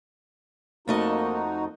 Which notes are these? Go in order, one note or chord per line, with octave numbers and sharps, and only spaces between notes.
F2 A3 A#3 D#4 F#4 D#5